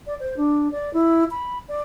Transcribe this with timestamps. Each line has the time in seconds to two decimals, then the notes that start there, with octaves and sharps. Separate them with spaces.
0.07 D5
0.20 C5
0.37 D4
0.72 D5
0.93 E4
1.31 B5
1.69 D5